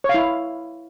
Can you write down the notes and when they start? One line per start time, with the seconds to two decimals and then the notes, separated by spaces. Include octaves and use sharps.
0.04 C#5
0.09 F5
0.14 E4